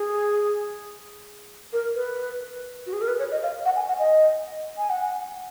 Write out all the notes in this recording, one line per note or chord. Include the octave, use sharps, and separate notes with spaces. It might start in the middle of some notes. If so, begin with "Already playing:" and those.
Already playing: G#4
A#4
B4
F#4
G#4
A#4
B4
C#5
D#5
F5
F#5
G#5
F#5
D#5
G#5
F#5